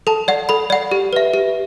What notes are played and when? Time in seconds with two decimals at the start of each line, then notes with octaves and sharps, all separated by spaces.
0.07 A4 A5
0.28 D5 F#5
0.49 A4 B5
0.70 D5 F#5
0.91 G4
1.13 B4 E5
1.34 G4